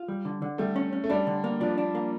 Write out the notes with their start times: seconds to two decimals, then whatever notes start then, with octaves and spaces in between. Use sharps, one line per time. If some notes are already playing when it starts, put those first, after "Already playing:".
Already playing: F4
0.08 G3
0.25 D3
0.42 D3
0.58 G3 A3
0.76 C#4
0.93 C#4
1.04 A3
1.10 G3 D4
1.27 D3
1.44 A#3
1.60 F3 D4
1.78 D4
1.95 A#3